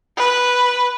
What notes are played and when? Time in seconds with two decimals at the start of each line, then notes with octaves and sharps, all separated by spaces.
0.18 B4